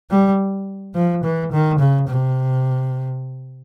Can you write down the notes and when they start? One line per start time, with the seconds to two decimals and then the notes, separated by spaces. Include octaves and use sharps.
0.11 G3
0.95 F3
1.24 E3
1.52 D#3
1.79 C#3
2.08 C3